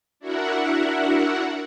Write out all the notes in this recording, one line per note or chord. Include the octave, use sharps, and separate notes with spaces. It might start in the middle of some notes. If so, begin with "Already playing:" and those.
D4 E4 F#4 A#4 E5 F#5